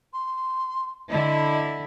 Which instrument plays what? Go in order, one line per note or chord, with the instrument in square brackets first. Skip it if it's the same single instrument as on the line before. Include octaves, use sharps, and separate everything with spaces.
[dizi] C6
[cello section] D3 E4 [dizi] D#5